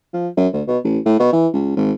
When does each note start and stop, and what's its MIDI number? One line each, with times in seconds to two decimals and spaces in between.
0.14 0.28 53
0.37 0.48 42
0.53 0.62 38
0.67 0.78 47
0.84 0.99 33
1.06 1.16 45
1.19 1.30 47
1.33 1.48 52
1.53 1.74 37
1.76 1.92 32